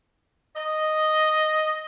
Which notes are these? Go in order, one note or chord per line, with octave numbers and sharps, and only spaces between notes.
D#5